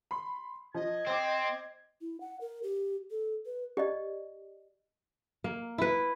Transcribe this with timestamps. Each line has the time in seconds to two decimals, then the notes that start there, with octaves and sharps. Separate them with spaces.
0.11 B5 C6
0.74 F3 D#5 G#6
1.07 C4 C5 D6
2.01 E4
2.21 F#5
2.41 A#4
2.63 G4
3.11 A4
3.46 B4
3.77 G4 D5 D#5
5.44 A#3
5.78 E4 B4